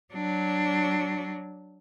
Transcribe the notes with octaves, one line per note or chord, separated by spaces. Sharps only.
F#3 D4